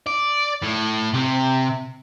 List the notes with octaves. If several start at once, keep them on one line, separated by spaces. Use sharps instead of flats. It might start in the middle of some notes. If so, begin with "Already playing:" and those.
D5
A2
C3